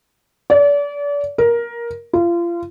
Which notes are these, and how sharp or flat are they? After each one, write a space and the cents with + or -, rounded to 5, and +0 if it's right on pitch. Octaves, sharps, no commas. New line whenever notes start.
D5 -35
A#4 +15
F4 -30